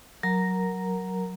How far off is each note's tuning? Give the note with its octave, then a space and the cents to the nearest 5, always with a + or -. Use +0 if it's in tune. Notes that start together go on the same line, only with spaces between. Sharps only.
F#3 +0 A#4 +0 A#5 +0